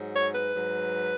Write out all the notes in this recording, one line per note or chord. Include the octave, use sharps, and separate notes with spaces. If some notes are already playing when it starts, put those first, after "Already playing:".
Already playing: G#2 F#3
C#5
B4
G#2 F#3